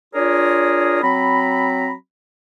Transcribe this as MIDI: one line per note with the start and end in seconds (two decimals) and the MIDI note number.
0.14 1.00 62
0.14 1.00 65
0.14 1.00 68
0.14 1.00 70
0.14 1.00 73
1.02 1.92 54
1.02 1.92 60
1.02 1.92 82
1.02 1.92 83